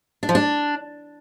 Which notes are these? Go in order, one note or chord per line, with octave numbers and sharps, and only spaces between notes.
D4
F3
D4